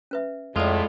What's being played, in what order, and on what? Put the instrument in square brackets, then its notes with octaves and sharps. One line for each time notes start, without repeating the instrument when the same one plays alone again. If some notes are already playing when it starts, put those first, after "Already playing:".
[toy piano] C#4 B4 E5
[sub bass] F2 [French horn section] A2 [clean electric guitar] G#3 F4 [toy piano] A4 D5